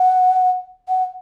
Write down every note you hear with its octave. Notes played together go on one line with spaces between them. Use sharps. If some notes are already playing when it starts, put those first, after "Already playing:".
Already playing: F#5
F#5